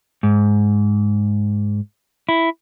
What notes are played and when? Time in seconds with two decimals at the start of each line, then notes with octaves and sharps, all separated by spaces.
0.23 G#2
2.29 E4